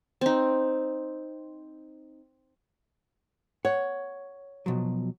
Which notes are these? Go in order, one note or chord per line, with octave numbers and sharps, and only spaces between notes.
C4 D#4
C#5 F#5
B2 F3 F#3